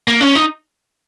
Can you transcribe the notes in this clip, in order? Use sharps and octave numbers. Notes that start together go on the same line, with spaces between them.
A#3
C#4
D#4